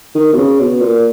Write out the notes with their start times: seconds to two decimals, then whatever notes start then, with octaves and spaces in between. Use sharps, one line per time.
0.15 D#3
0.32 B2
0.37 C#3
0.59 B2
0.82 A#2